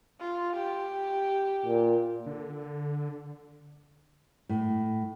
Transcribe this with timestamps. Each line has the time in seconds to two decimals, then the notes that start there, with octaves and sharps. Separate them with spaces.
0.21 F4
0.56 G4
1.66 A#2
2.26 D3
4.49 A2